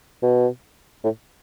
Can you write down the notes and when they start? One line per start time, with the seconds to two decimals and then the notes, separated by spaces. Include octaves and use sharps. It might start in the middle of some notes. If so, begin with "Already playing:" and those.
0.23 B2
1.04 A2